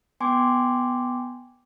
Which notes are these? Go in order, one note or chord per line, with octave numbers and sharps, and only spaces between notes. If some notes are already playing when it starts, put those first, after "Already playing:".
B3 G5 G#5 C6 D6